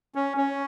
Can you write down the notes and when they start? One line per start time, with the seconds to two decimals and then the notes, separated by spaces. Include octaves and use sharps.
0.15 C#4
0.37 C#4